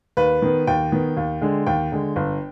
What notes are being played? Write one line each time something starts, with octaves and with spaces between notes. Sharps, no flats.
D#2 B4
D#3 B3
D#2 G5
D#3 B3
D#2
D3 G#3
D#2 G5
D3 G#3
G1